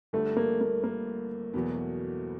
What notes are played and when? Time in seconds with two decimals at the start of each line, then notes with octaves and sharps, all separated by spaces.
0.13 G1 G2 D3 A3
0.37 A#3
0.61 A#3
0.84 A#3
1.54 E2 B2 F#3 B3